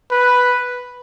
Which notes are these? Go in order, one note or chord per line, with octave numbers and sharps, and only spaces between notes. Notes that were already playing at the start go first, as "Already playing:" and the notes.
B4